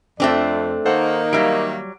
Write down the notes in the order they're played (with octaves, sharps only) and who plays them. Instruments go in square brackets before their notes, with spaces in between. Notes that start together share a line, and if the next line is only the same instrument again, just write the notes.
[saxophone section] F2 [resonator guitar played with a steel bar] A3 C4 D4 [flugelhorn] D5
[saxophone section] D#3 A#3 [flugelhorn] D#4 [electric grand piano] A4 C5 F#5
[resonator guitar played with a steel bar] F#3 G3 [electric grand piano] E5 F5 D7